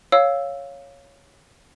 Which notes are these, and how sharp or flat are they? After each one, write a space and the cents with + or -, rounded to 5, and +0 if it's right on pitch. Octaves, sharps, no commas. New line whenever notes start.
C#5 +0 F5 +0 E6 +0